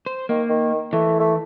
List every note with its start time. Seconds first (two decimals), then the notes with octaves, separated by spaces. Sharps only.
0.06 C5
0.29 D#3 A#3
0.50 D#3
0.93 E3 A3
1.20 A3